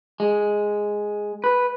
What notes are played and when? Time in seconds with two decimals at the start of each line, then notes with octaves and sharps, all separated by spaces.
0.20 G#3
1.44 B4